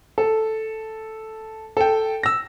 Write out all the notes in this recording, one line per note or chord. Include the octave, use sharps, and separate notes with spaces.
A4
A4 G5
E6 A#6